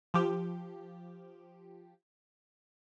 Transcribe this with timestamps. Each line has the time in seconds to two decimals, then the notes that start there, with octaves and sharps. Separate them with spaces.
0.14 F3 G4